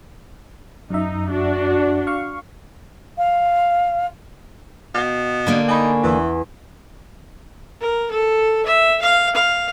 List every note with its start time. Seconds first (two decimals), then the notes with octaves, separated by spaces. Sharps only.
0.90 F#2 D#4 E5
1.30 D4 F#4
2.07 F5 C#6
3.18 F5
4.94 B2 F5 F6
5.47 D3 A#3 D4
5.68 D#4 G#5 B5 C#6
6.03 E2 E3
7.81 A#4
8.11 A4
8.66 E5
9.02 F5
9.35 F5